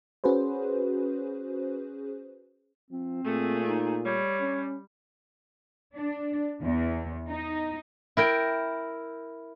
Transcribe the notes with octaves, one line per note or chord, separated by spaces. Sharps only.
C#4 F#4 G#4 B4 C5
F3 C4
A#2 A3 G#4
D#4
G3 C#5
C#4
D4
E2
D#4
E4 A#4 G5